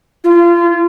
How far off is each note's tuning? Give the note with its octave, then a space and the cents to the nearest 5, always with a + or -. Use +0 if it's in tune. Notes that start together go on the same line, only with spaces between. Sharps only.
F4 -25